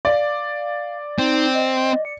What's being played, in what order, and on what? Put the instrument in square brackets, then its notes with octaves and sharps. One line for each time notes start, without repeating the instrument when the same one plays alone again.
[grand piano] D5 [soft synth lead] F5
[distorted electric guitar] C4 [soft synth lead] D#4
[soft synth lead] D#5
C#7